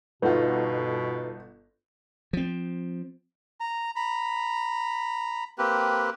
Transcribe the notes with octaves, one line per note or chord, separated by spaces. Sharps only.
G1 B2 D#4 F4 A4 B4 F#5
F3 C4
A#5
A#5 B5
A#3 C4 G4 B4